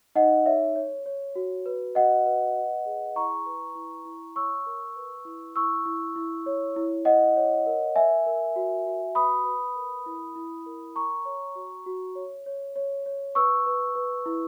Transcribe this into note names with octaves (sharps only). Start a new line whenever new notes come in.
D#4 D#5 F#5
C#5 E5
C#5
C#5
F#4
B4
F#4 D#5 F#5
B4
B4
G#4
E4 A#5 C#6
B4
E4
E4
C#5 C#6 E6
A#4
B4
E4
E4 C#6 E6
E4
E4
C#5
E4
E4 D#5 F#5
C#5
A#4
A#4 E5 G#5
A#4
F#4
F#4
B4 B5 D#6
B4
A#4
E4
E4
A#4
A#4 A#5 C#6
C#5
F#4
F#4
C#5
C#5
C#5
C#5
B4 C#6 E6
B4
B4
E4